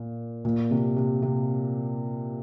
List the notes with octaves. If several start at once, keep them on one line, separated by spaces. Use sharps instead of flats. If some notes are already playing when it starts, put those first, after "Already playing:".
Already playing: A#2
A#2
C3
C3
C3